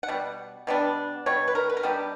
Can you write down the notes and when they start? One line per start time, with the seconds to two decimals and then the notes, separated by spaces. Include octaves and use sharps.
0.03 F#5
0.08 B2 G3
0.67 B2 G3 B3 D4
1.26 B2 G3 C#5
1.48 B4
1.55 A#4
1.69 B4
1.77 A#4
1.83 B2 G3 B3 D4 G4